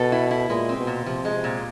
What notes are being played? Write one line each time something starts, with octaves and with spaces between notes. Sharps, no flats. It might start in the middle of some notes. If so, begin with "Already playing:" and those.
Already playing: B2 A4
E4
E4
A#2 G#3
C4
B2
A#2
C3 F3
G#3
C3
A#2